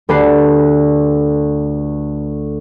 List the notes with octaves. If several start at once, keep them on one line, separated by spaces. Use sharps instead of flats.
D2 G4 B4 A5 C7